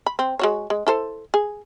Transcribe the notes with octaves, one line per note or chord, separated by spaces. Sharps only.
B5
C4
G#3 F#4 C#5
G#3
E4 A4 C5
G#4